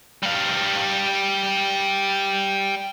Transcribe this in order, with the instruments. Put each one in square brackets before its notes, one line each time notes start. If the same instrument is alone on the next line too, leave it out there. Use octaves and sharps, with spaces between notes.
[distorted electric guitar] G3 F5